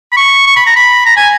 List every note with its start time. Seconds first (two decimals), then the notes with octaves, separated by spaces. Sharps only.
0.12 B5
0.17 C#6
0.47 C#6
0.56 B5
0.67 A#5
0.76 B5
1.06 A#5
1.17 G#5